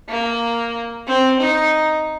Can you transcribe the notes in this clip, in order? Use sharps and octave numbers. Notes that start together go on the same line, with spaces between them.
A#3
C4
D#4